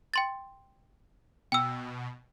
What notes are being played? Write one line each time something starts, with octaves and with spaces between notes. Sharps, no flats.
G5 C6 A6
B2 G5 E6